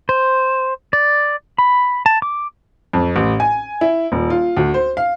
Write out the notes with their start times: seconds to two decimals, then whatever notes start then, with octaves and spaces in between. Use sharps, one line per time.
0.09 C5
0.93 D5
1.58 B5
2.06 A5
2.22 D6
2.93 F2
3.16 A1
3.40 G#5
3.81 E4
4.12 D#1
4.30 F4
4.57 D2
4.74 C5
4.97 F5